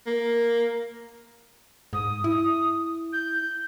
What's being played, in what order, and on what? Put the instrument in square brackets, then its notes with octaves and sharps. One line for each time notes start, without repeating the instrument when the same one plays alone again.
[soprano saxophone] A#3
[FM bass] G#2 [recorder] D#6
[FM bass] E4
[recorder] G6